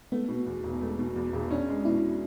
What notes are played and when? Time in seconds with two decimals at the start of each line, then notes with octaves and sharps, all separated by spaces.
0.12 A3 B3
0.29 B2
0.46 E2
0.64 E1
0.81 A3
0.99 B2
1.16 E2
1.33 E1
1.50 C#4 D4
1.68 G#3
1.85 B2 E4